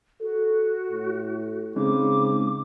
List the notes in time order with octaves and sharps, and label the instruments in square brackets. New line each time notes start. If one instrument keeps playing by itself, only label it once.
[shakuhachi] F#4 [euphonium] A4
[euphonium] A2
[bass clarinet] C#3 [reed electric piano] G#3 C#4 D#4 [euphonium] C4 [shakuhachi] D6